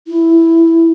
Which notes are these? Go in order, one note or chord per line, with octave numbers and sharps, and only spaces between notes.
E4